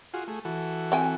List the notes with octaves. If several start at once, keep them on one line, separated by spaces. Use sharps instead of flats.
F4 F#4 G#4
A3 G#4
E3 F#4 A4
C4 G5 G#5